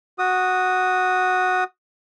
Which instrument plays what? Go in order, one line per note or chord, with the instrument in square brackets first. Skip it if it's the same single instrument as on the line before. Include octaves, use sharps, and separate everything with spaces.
[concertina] F#4 D#6